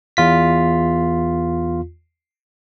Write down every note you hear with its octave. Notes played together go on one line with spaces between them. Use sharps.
E2 F4 B6